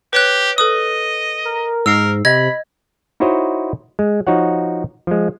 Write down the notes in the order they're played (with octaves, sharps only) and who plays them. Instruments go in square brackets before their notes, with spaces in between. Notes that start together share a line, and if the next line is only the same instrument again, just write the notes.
[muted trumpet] G4 [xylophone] B4 C#5 F#6
[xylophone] A4 B4 D#6 [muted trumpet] D#5
[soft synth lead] A#4
[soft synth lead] G#2 [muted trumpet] A#4 [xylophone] E6 C7
[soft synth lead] C3 [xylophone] D#5 G#6 [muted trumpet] B5
[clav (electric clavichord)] D#4 E4 F#4 C5 C#5 D#5
G#3
F3 D#4 F#4 C#5 F#5
F3 G#3